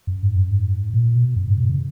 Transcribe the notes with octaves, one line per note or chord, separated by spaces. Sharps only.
F#2
G#2
F#2
G#2
A#2
B2
F#2
G#2
B2
C#3